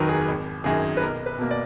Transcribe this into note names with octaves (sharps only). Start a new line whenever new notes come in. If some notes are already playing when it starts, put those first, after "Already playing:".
Already playing: F1 D#2 D#3 F#3 A#4 B4
G#4
G#1
F#2 D#3 G#4
B4
B1 A#4
B4
B2 A#3
D5